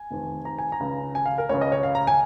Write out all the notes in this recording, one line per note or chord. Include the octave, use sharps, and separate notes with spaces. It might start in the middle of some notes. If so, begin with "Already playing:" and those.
Already playing: G#5
F1 F2 D#3
A#5
G#5
A#5
C#2 C#3
G#5
F5
A#4
C#2 C#3 C#5
D#5
C#5
F5
A#5
G#5